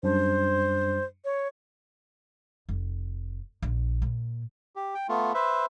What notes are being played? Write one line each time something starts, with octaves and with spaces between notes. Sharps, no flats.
F#2 G3 D4 C5
C#5
F1
A#1
A#2
G4
G5
A3 B3 F4
B4 C5 E5